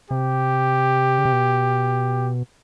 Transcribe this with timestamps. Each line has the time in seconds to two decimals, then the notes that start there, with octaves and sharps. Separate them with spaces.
0.10 C3 G4
1.18 C#3
1.25 C3
1.33 B2